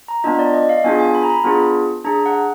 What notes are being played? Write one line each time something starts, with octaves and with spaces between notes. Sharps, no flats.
A#5
B3 D4 F4 D#5
D5
D#5
F5
B3 D4 F4 G#4 G#5
G#5
B5
A#5
B5
B3 D4 F4 G#4
D4 G#4 A#5
F#5